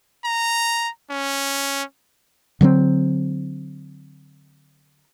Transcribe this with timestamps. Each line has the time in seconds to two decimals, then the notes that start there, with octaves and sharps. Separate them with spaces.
0.25 A#5
1.11 C#4
2.61 D3 F#3 G#3 C4